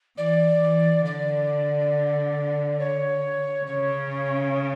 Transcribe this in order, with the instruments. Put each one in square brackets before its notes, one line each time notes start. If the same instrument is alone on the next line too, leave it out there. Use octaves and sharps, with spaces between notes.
[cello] E3 [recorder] D5
[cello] E3
[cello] D3 [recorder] D5
[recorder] C#5
[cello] C#3 [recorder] C#5